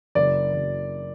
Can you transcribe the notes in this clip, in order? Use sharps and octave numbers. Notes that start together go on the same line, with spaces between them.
F#1 D5
F#1